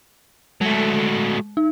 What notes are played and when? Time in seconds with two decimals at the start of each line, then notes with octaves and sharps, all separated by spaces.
0.61 F#3 G#3 A3
1.57 D#4